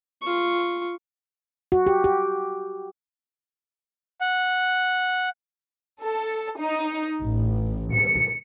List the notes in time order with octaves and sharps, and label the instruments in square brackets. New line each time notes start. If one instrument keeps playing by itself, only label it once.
[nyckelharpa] F4 C#6
[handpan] F#4
G4
G4
[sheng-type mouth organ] F#5
[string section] A4
D#4
A1
C#7